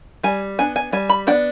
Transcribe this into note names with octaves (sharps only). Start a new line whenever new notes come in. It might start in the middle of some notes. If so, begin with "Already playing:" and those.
G3 G#5
B3 D4 G#5
G#5
G3 G#5
B5
B3 D4 G5